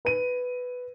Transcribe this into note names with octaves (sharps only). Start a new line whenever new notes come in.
B4 D#7